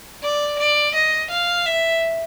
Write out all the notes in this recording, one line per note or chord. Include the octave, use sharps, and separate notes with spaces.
D5
D5
D#5
F5
E5